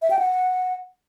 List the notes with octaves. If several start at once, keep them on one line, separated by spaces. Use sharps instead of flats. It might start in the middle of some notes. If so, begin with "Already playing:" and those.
E5
G5
F#5